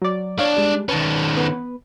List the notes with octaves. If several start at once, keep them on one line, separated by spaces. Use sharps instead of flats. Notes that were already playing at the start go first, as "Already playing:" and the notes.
F#3 D5
D4 C#5 F5
G3 G#3
D#3 C#4 B4 A5
B3 B4